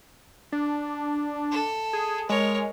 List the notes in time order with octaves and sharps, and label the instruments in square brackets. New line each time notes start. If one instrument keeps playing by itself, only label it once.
[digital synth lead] D4
[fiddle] A4
[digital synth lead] G#4
[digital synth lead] G#3 [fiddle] A#4 C#5